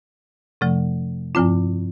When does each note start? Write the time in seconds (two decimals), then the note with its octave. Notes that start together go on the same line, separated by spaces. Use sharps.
0.61 F2 C3 F3 A3
1.35 G2 F3 C4 F4